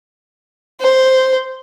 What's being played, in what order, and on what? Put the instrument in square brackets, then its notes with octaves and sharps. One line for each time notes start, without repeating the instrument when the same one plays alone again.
[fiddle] C5